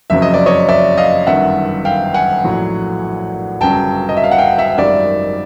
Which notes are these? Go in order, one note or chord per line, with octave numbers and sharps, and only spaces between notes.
F#1 F2 C#3 F#3 E5
D#5
D5
C#5 D#5
D5 E5
D#5 F5
G1 F#2 D#3 E5 F#5
F5 G5
F#5 G#5
A#1 A2 F#3
G1 F#2 C#3 F#3 G5 A5
D#5
E5
F5
F#5
F5 G5
E5 F#5
G#1 F#2 D#3 G3 D5 E5